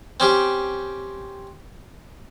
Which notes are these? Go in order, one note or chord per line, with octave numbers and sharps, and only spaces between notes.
C4 C#4 G4